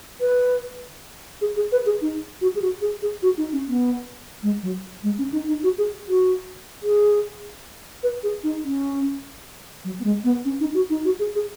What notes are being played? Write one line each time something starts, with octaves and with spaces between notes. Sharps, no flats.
B4
G#4
G#4
B4
G#4
D#4
F#4
G#4
F#4
G#4
G#4
F#4
D#4
C#4
B3
G#3
F#3
G#3
C#4
D#4
D#4
F#4
G#4
F#4
G#4
B4
G#4
D#4
C#4
F#3
B3
G#3
B3
C#4
D#4
F#4
D#4
F#4
G#4
G#4